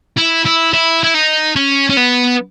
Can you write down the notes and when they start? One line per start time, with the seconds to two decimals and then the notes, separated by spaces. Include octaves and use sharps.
0.17 E4
0.45 E4
0.73 E4
1.04 E4
1.14 D#4
1.56 C#4
1.90 C#4
1.97 B3